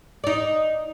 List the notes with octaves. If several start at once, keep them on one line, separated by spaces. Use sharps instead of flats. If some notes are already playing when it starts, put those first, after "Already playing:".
D#4 D5